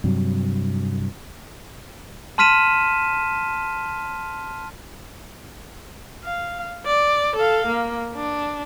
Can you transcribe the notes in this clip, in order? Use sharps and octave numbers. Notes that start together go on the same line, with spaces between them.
G2 C3 F#3
A5 C6 F6 B6 D#7 E7
F5
D5
A4 F5
A#3
D4